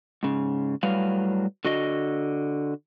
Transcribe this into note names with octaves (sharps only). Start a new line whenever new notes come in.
G#2 C#3
A2 F#3 G3 B4 F5
D3 F#4 D#5